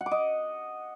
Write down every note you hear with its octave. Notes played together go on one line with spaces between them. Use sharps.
F#5
D6
D#5